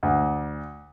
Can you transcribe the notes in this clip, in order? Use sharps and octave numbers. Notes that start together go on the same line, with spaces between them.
D2